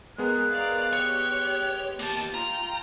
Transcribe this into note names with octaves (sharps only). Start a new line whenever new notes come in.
G#3 B3 G#4 A#4 F#6
A#4 D5 F5
G4 C#5
A#3 G4 A5 A6
F4 G5 A#5